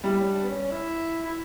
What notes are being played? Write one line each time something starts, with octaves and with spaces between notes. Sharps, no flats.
G3 E4
C#4
D4
B3
C#4
E4
E4